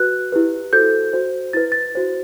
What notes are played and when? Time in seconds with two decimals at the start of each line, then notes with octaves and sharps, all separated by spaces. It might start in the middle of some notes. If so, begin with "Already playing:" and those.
Already playing: F#4 B4 F#6
0.32 E4 G4 B4
0.73 F#4 A4 C5 G6
1.13 F#4 C5
1.53 E4 B4 A6
1.72 A6
1.95 F#4 C5